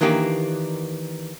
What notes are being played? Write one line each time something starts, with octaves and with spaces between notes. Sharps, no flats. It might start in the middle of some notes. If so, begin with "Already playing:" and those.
D#3 E3 A#3 D4 G4